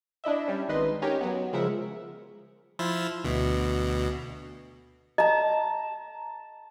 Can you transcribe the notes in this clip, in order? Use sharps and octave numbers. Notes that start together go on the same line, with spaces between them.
D4 E4 D#5 E5
G3 C#4
G#1 D#4 B4 D#5 C6
C#4 D#4 G4 A#4 C#5
F#3 B3
C#3 F3 G#3 A#4 E5 F#5
F3 E4 F4
D2 B2
D#5 A5 A#5